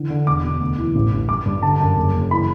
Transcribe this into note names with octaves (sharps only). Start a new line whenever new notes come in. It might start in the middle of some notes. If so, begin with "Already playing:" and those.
Already playing: D3 E3
D3
E1 D6
B2
D2
E3
A1
A1
G2 D6
G2
D3 A5
F#2
F#1
F#1
E3 B5